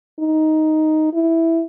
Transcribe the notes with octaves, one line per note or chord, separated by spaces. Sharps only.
D#4
E4